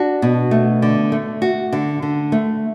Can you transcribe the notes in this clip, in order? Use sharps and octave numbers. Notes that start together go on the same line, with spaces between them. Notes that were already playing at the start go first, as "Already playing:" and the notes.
Already playing: D4 F#4
B2
A3
D3
A3
F#4
D3
D3
A3